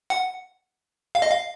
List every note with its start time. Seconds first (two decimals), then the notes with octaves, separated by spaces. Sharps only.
0.10 F#5
1.15 F5
1.22 D#5
1.30 F5